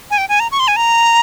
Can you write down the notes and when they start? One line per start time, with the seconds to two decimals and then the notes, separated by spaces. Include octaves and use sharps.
0.11 G#5
0.18 G5
0.29 G#5
0.40 A#5
0.52 C#6
0.60 C6
0.68 G#5
0.76 A#5